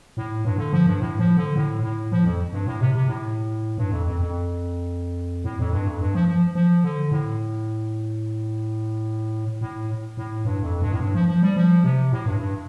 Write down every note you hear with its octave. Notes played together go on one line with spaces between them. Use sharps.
A2
G2
D3
F3
G2
A2
F3
D3
A2
A2
F3
F2
G2
A2
C3
C3
A2
G2
F2
F2
F2
A2
F2
G2
F2
G2
F3
F3
F3
D3
A2
A2
A2
G2
F2
G2
A2
G2
F3
F3
G3
F3
C3
A2
G2
G2